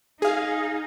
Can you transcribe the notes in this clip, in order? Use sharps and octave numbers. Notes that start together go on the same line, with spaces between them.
D#4 G#4 F5